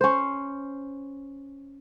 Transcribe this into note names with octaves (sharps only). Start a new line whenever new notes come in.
C#4 C5